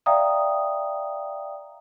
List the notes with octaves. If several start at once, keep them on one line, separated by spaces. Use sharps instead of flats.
D5 E5 F5 G5 A#5 D#6